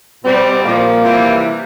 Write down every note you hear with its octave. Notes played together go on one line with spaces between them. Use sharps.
B2 G3 C4
A#2 F3 A#3
C3 E3 G3